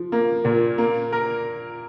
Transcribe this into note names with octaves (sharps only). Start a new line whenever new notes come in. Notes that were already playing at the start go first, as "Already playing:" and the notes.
Already playing: F3
A#3
A#2
A#3
A#4